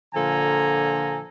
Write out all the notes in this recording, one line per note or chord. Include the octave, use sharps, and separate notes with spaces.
A#2 D3 F3 A4 G#5 A#5